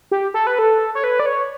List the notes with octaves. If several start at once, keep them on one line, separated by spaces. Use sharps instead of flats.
G4
A4
B4
A4
C#5
B4
D5
C#5